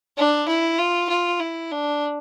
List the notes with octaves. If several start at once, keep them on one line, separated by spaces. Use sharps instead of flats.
D4
E4
F4
F4
E4
D4